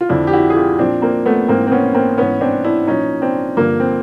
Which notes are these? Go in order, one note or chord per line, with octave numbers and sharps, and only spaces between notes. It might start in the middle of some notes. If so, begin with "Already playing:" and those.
F4
F2 D3 F3 D4 E4
G4
E4 F#4
G#4
F4 G4
A#2 F3 C4 D4
A#3 C4
A3 B3
G#2 E3 A#3 C4
C4
B3 C#4
A#3 C4
G#2 E3 B3 C#4
C4 D4
D4 E4
A#2 F3 C#4 D#4
C4 D4
G2 D3 F3 A#3
C4